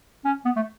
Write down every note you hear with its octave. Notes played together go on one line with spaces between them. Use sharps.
C#4
B3
A3